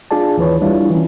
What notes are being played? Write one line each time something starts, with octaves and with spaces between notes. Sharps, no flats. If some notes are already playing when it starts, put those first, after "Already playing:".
D4 F4 G#4 D5 A5
D#2 E3 B4 C#5
G3 D4 E4 F4
E3 C#4